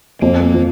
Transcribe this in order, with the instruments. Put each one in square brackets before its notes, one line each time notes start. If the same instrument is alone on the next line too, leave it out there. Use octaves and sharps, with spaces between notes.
[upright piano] F2 [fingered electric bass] A#3
[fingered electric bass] A#3
[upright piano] F3